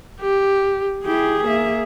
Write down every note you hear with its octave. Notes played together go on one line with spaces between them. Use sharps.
G4
E4 G4 G#4
A#3 E5